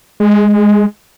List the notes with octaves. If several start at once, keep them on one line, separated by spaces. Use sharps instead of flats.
G#3